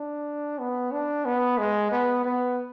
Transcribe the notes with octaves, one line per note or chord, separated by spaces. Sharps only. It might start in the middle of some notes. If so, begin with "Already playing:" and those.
Already playing: D4
B3
D4
B3
G#3
B3
B3